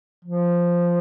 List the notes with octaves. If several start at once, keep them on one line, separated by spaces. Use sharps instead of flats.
F3